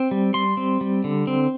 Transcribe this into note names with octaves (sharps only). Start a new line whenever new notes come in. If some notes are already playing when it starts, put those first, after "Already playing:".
Already playing: C4
G3
G3 C6
C4
G3
D3
C4